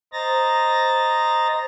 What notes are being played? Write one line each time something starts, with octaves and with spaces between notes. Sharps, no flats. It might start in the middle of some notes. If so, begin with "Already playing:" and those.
C5 D#5 A#5 A6 A#6